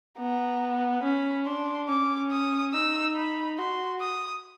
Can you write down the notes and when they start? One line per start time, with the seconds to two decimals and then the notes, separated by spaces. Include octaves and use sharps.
0.18 B3 A#5
1.03 C#4 B5
1.46 D4 C6
1.89 C#4 D6
2.31 D#6
2.73 D#4 E6
3.16 B5
3.59 F#4 C6
4.01 D#6